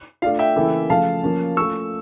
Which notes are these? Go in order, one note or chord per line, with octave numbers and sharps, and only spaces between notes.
A3 D4 F4 F5
E5 G5
C#3 E3 A#3 E4 A4
C#3 F3 A3 F5 A5
F3 A#3 C#4
A3 C#4 F4 C#6 E6